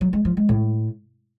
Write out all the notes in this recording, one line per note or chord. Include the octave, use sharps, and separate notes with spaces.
F#3
G#3
F3
G#3
A2